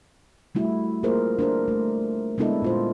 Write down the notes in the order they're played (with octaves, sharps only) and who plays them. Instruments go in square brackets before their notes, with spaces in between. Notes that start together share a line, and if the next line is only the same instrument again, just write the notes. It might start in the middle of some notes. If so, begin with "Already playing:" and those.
[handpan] G3 A3 E4 F#4
A#3 F4 G#4 A#4 C5
D4 A#4 C5
A3
G#3 B3 D4 E4 A4 D#5
A#2 F4 C5